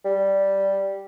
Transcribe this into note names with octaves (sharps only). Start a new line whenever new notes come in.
G3